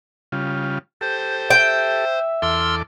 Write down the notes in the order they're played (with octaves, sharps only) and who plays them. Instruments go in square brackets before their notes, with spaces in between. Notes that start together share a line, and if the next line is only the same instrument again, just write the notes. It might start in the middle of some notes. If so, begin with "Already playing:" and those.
[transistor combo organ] C#3 G3 F4
[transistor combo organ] G4 A4 [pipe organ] C5
[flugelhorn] E5 [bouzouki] G5
[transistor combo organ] E2 A4 D6 [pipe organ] C6 E6 F6